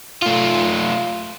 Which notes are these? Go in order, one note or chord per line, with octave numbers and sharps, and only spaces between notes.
A3 F4